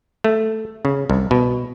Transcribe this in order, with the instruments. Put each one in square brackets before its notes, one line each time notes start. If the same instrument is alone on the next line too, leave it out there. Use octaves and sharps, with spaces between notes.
[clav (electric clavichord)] A3
C#3
C2
B2